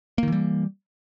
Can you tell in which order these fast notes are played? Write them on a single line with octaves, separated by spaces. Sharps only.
A#3 D#3 E3 G3